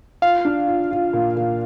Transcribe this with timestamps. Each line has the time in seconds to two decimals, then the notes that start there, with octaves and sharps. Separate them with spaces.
0.22 F4 F5
0.45 D4
0.68 F4
0.91 F4
1.13 A#2
1.36 A#2